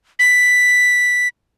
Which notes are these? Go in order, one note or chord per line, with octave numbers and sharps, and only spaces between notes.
B6